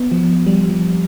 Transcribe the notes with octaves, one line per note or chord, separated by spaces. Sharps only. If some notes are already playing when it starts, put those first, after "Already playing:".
Already playing: B3
F3
G3
F3